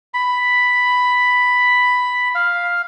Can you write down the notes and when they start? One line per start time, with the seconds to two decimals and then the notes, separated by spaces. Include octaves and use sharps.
0.14 B5
2.35 F5